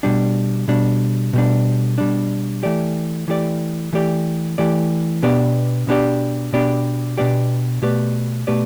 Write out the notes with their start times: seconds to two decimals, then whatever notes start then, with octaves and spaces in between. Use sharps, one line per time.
0.03 B2 G3 D4
0.68 B2 G3 D4
1.33 B2 G3 D4
1.98 B2 G3 D4
2.63 E3 A3 G4 D5
3.28 E3 A3 G4 D5
3.93 E3 A3 G4 D5
4.58 E3 A3 G4 D5
5.23 B2 B3 D4 G4 D5
5.87 B2 B3 D4 G4 D5
6.53 B2 B3 D4 G4 D5
7.18 B2 B3 D4 G4 D5
7.82 B2 A3 G4 B4 D5
8.47 B2 A3 G4 B4 D5